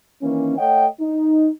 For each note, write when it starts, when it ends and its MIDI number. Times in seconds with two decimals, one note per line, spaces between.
0.22 0.54 51
0.22 0.54 52
0.22 0.54 58
0.22 0.54 61
0.58 0.86 57
0.58 0.86 73
0.58 0.86 75
0.58 0.86 78
0.58 0.86 79
1.00 1.50 63